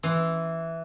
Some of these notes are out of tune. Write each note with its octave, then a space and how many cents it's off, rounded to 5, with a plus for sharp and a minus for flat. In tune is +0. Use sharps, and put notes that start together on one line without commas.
E3 +0 C6 +0